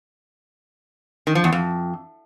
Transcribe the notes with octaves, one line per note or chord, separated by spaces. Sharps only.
D#3
F3
E2
F2